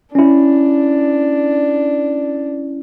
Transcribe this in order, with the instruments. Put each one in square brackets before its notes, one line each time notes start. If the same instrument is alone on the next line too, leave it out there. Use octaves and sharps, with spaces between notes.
[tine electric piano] C#4 E4 [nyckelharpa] D4